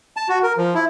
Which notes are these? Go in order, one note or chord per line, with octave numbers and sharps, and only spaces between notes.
A5
F#4
A#4
F3
E4